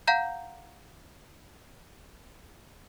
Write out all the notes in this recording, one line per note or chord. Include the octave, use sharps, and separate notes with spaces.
F5 F#5 A#5 G6